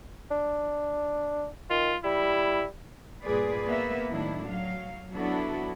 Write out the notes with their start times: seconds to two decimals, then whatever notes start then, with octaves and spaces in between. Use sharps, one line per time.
0.31 D4
1.70 D#3 F4
2.04 G3 E4
3.25 G2 A#2 G#4 B4 D5
3.66 A#3 B3 B4 E5
4.10 F#2 A2 D#3 D4 E4
4.47 F#3 F5
5.14 F#3 B3 D4 E4 F#4 A4